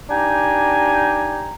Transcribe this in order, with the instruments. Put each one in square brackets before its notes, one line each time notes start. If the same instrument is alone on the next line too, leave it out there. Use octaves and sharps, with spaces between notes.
[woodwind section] D4 D#4 G4 G5 G#5 A#5